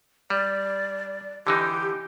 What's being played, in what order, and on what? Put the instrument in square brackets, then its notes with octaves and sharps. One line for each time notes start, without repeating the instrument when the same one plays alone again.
[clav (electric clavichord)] G3 [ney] D5
[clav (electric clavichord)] D3 E3 D#4 [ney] G4